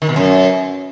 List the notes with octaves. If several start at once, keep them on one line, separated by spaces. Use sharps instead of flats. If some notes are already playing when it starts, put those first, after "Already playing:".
D#3
B2
F#2